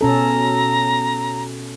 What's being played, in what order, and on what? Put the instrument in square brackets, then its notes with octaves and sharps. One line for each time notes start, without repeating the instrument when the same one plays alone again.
[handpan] B2 C#4 A4 [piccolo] A#5